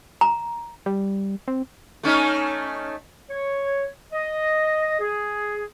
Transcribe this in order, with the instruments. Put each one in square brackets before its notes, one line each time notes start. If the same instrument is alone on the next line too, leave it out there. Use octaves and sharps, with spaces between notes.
[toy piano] A#5
[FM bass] G3
C4
[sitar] A3 C#4 D#4
[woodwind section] C#5
D#5
G#4